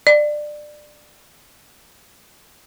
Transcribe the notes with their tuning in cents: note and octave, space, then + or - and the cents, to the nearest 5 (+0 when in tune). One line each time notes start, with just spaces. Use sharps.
D5 +20